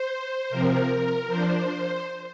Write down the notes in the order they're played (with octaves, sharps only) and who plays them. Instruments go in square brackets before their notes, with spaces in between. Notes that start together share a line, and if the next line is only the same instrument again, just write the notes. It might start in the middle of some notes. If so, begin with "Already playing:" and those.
Already playing: [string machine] C5
C3 F3 C4 A#4
F3 D4 C5